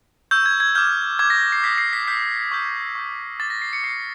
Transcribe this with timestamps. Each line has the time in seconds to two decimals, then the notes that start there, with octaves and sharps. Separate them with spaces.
0.31 C#6 E6 G6
0.46 G#6
0.60 G#6
0.75 D6 F6 G6
1.19 D6 F6 G#6
1.30 A#6
1.52 C7
1.63 D#6 G6 B6
1.78 C7
1.93 B6
2.08 D#6 G6 B6
2.51 C#6 E6 G6
2.95 C#6 E6 G6
3.40 D6 F6 A6
3.50 A#6
3.62 C7
3.73 C#7
3.83 D6 F6 C7